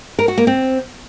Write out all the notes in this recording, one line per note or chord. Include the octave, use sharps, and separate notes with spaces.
A#4
F#4
A#3
C4